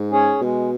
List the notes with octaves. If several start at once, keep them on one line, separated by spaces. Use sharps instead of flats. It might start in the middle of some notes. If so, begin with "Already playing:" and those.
Already playing: G#2
C#4 G#4 C#5
B2 G#3